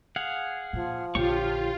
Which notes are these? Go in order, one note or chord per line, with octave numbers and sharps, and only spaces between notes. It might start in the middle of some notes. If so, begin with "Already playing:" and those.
G#4 F5 F#5
A#2 F3
A#1 D3 F4 G4 C#5 C#6